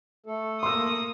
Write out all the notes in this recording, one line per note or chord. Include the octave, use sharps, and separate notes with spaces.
A3 A4
A#3 C6 D#6 E6